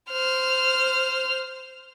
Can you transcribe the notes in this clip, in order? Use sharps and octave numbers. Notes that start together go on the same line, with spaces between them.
C5 F6